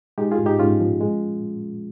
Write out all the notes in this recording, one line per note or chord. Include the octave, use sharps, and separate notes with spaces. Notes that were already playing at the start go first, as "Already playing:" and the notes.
G#3 D#4 G4
F4 G#4
G#2
D#4 G4
G#2 C#4 F4
F3
G#3